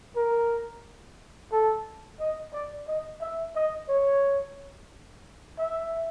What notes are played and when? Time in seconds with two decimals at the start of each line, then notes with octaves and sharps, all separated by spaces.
0.16 A#4
1.52 A4
2.20 D#5
2.53 D5
2.88 D#5
3.21 E5
3.56 D#5
3.89 C#5
5.59 E5